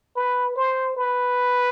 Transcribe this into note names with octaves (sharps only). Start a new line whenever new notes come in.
B4
C5
B4